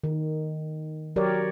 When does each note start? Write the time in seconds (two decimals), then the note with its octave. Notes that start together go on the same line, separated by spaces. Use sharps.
0.04 D#3
1.16 F#3 G4 A#4 C#5 D5